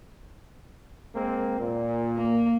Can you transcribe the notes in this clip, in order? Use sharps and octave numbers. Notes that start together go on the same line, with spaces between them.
G#3 A#3 C4
A#2
A#3